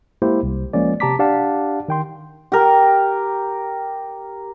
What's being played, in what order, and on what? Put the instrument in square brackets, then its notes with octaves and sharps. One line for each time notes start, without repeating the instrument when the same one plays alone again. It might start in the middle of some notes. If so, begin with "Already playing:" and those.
[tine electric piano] G#3 A#3 E4 G4 C5
C2
F3 G#3 A#3 C#4 D5
C3 G4 A5 A#5 D6 B6
D4 G4 D5 F5 F#5 A5
D#3 G5 C6
[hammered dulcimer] G4 A#4